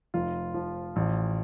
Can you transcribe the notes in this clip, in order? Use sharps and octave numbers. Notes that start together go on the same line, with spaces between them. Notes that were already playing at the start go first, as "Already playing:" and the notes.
F1 F4
F3
A1